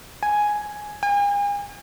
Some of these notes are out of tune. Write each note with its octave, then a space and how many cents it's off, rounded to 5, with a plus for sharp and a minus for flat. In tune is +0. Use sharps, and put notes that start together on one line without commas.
G#5 +5
G#5 -40